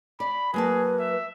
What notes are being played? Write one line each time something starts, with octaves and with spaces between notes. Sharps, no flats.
D5 B5
F#3 A#3 G#4 B4 A5
E5